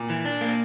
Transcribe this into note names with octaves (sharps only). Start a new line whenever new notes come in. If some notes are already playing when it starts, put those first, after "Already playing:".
Already playing: A#2
E3
D4
A#3